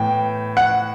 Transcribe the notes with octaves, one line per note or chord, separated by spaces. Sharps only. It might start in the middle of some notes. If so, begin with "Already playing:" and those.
Already playing: A2 E3 B3 G5
F#5